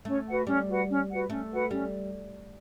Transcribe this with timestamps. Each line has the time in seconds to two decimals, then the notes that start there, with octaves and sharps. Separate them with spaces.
0.05 A3 C#4
0.26 F#4 B4 F#5
0.47 G3 C#4
0.67 F#4 B4 F#5
0.89 C#4
1.09 F#4 B4 F#5
1.29 A3 C#4
1.50 F#4 B4 F#5
1.71 G3 C#4